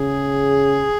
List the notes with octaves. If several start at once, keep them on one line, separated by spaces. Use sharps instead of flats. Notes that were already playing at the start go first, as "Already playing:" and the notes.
Already playing: C#3 G#4